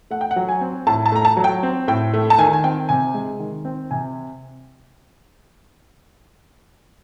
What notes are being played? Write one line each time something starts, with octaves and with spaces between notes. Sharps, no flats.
A3 F#5
G5
F#5
F#3
G#5
C4
A2 A5
A5
A3 A#5
A5
F#3
G5
C4
A2 G5
A3
A5
D#3 G#5
G#5
C4 G5
C3 G#5
G#3
D#3
C4
C3 G#5